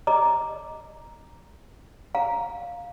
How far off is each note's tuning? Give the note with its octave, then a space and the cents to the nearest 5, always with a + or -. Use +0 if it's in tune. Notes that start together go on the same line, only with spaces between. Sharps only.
D#5 +0 A#5 +0 D6 +0
F5 +10 A#5 +0